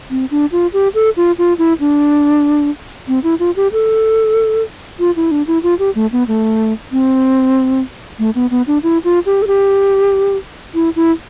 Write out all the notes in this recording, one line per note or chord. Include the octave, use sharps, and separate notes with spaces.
C4
D4
F4
G4
A4
F4
F4
E4
D4
C4
E4
F4
G4
A4
F4
E4
D4
E4
F4
G4
A3
B3
A3
C4
A3
B3
B3
D4
E4
F4
G4
A4
G4
E4
E4